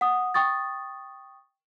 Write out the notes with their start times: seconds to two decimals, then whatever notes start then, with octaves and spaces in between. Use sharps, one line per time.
0.01 F#5 D#6
0.34 G5 C#6 D#6 A6